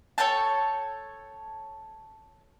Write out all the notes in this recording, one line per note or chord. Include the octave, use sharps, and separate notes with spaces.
A4 C#5 G5 A5